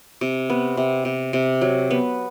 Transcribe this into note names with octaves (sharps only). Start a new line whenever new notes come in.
C3
B3
C3
C3
C3
F#3
B3